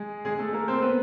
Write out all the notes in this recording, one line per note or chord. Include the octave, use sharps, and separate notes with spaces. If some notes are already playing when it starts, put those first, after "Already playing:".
Already playing: G#3 G#4
G#3 G#4
A3 A4
A#3 A#4
C4 C5
B3 B4